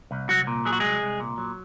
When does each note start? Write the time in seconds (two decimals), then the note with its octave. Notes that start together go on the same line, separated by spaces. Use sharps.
0.11 C2
0.29 C2 F#3 F#4
0.47 A#2
0.65 F#3 G#4
0.73 F#4
0.80 C2 G#3 G#4
1.02 C2
1.20 A#2
1.38 F#3